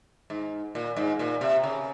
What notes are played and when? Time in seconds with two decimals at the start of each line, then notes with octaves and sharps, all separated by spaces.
0.30 G#2
0.75 A#2
0.97 G#2
1.19 A#2
1.41 C3
1.63 C#3